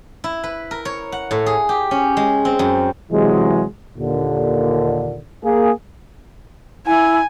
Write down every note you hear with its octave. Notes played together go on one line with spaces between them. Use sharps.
E4
B4
A#4
C#5
F#5
A2
G#4
G4
C#4
G#3
C4
F#2
C3 E3 F#3 G#3
D#2 A#2 D3
A#3 G#4
E4 G#5